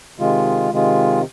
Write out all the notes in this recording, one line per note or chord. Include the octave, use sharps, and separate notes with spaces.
C3 D#3 G#3 F4
C3 D#3 G#3 F4